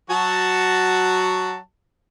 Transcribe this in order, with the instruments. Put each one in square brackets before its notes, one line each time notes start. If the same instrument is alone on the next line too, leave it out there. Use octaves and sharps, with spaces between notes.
[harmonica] F#3 F#4 A5